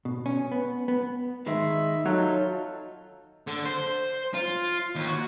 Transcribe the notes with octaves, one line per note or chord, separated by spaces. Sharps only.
B2
C#4
B3
B3
D#3 G#3 E5 B5
F#3 D#4 F4 A4 G6
D3
C5
F4
D#2
F#4